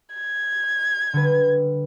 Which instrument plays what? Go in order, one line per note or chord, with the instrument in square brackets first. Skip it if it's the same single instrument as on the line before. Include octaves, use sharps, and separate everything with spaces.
[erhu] G#6
[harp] D3 G3 B4